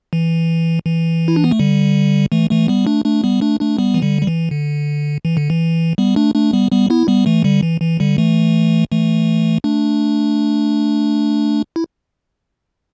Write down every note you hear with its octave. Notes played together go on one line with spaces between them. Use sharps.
E3
E3
E4
D4
B3
A3
D3 G3
E3 A3
E3 A3
G3 B3
A3 D4
A3 D4
G3 B3
A3 D4
A3 D4
G3 B3
E3
D3 G3
G3
E3
D3
E3
D3
E3
G3 B3
A3 D4
A3 D4
G3 B3
G3 B3
B3 E4
G3 B3
E3 A3
D3 G3
E3
E3
D3 G3
E3 A3
E3 A3
A3 D4
E4